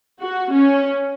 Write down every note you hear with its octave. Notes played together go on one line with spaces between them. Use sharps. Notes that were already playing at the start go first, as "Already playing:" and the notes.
F#4
C#4